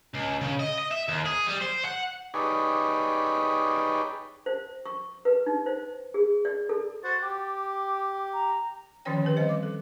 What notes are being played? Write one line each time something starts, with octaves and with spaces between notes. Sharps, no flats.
C#2
C#3
D#5
D#5
E5
D#2
G#4
G3
C5
F#5
D#4 G4 G#4 B4 C#5 D5
C5
C#6
B4
D#4
C5
G#4
D5
A4
F#4 C5 F#5 A6
G4 D6
A#5
D3 D#3 F3 C#4 C#5 G5
D#3 C4 G4 B4
G3 C4 C5 D#5
D6
A4